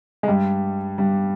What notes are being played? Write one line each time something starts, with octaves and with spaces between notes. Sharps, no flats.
G#3
G2 G3
G2 G3